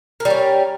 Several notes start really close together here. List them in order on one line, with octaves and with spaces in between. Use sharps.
A#4 G3 C#4